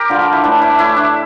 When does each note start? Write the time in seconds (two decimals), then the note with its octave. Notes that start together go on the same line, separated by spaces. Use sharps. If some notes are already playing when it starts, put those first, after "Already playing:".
Already playing: G4 A#4
0.10 D3 G3 F4
0.21 F4
0.33 E4
0.44 A2 E3 A3 D4
0.62 E4
0.79 A2 E3 A3 E4
0.97 D4